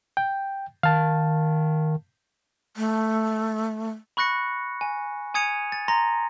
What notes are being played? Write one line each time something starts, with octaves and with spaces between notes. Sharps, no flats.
G5
D#3 F5 A5
A3
B5 C#6 F#6 A#6 C#7
G#5
G#5 D#6 G#6 C#7 D#7 F7
A6
A#5 C6 A#6